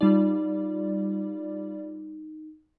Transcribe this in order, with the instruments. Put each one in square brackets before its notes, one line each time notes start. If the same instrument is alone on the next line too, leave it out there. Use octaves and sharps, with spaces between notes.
[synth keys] G3 F4 D5 [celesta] D#4